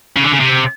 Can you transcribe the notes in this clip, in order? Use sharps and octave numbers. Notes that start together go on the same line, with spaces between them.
C#3
D3
C#3
C3